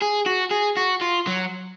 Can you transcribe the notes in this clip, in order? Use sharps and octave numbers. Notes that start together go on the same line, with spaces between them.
G#4
F#4
G#4
F#4
F4
F#3